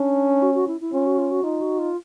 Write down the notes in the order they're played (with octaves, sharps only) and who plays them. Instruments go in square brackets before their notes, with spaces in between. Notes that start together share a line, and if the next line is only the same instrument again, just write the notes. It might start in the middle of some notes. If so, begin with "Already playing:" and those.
Already playing: [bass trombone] C#4 [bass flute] D4
[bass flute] F#4
F#4
E4
E4
[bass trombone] C#4 [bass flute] F4
[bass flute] F#4
F4
F#4
[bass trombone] D#4 [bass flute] F4
[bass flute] F#4
F4